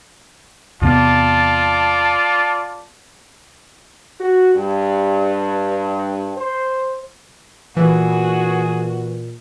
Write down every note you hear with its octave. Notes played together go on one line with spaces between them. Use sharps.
E2 C3 B3 F4 D5 A5
F#4
G2
C5
A#2 E3 F#4 G#4